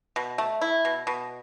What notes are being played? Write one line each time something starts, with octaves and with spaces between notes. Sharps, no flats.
B2
A3
E4
B2
B2